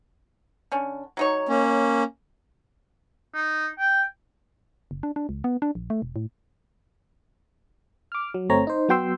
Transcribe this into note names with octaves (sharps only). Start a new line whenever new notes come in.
D3 C#4
F#3 D#4 C#5
A#3 C#4
D#4
G5
F#1
D4
D4
C#2
B3
D4
A#1
A3
E1
A2
D6 F6
F#3
G1 A3 C4 C#5 A#5
D#4 C5
F#3 B3 F#4 G5 C6 E6